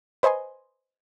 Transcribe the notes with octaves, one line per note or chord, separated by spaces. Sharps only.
B4 C5 D#5 G#5 C6